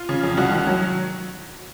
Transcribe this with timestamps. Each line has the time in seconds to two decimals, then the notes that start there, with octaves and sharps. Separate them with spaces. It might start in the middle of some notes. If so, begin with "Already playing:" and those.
Already playing: F4
0.09 C#3
0.23 F2
0.37 C2 F#4
0.52 D#3
0.67 F#3